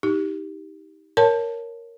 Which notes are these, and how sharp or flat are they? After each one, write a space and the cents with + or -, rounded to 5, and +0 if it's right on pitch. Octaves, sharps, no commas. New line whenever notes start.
D#4 +25 G4 +0
A#4 +0 C#5 +0 A5 +0